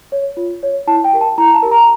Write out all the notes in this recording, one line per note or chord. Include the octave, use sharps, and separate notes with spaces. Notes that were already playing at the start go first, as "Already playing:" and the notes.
C#5
F4
C#5
E4 A5
G5
G4 A#4
A5
E4 A#5
A5
G4 A#4
A#5